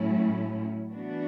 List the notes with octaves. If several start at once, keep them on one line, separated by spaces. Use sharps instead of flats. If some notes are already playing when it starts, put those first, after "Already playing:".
Already playing: A2 F#3 A3 C#4 E4
E3 B3 D4 F#4